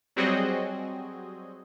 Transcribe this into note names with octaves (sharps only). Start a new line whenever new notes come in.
F#3 G3 C4 F#4 G#4 D#5